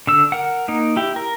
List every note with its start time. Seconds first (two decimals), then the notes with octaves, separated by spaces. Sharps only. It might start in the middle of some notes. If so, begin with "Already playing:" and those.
0.07 D3 E6
0.32 A#4 F#5
0.68 A#3 D#4
0.96 E4 G4
1.16 A#4